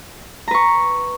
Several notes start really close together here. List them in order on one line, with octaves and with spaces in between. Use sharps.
A#5 B4 C#6